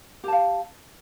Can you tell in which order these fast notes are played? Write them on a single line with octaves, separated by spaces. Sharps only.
G4 A5 F5